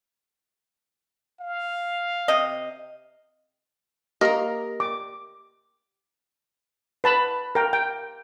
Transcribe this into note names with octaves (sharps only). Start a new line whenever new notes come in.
F5
C3 D#5
A#3 G4 A#4 D#5 A#5
D6
B4 A5 B5
A#4 G5
G5